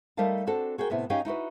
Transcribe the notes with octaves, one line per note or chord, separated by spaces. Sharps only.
G3 A3 D#4 A#4 F5 A5
C4 D4 F#4 A4
F#4 G#4 A#4 G5
A2 C3 B3 E4
C#4 D#4 G4 F5 G5
D#4 E4 F#4 B4